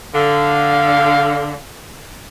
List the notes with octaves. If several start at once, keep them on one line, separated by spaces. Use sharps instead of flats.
D3 F5